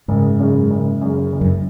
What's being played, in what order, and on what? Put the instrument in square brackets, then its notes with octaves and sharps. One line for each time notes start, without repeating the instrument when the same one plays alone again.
[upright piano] F#1 [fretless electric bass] G#2
[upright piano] F#2 C#3
F#1
F#2 C#3
F#1
[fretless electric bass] F#2